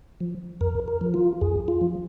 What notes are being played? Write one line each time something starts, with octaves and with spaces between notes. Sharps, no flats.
F3
F2 A#4
A#4
F3
F4
F2 G#4
F4
F3